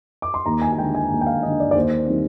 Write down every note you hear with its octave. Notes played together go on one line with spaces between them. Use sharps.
D6
C6
D#2 A#5
G#5
G#5
D3 G#3 G5
G#5
D#2
G5
F5
D3 G#3 D#5
D5
D5
D#2 C5
D#3 G3 C4